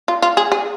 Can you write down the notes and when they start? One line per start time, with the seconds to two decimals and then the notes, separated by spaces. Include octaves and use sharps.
0.08 F4
0.22 F4
0.37 G#4
0.52 G#4